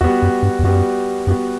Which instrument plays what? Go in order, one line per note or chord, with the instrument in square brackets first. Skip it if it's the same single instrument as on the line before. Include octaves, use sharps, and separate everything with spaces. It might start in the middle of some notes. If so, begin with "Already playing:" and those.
[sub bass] E2 [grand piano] F#4
[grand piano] G3 B3
[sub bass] F#2
G2
E2
[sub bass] F#2 [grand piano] G3 B3 F#4
[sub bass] F#2 [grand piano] G3 B3 F#4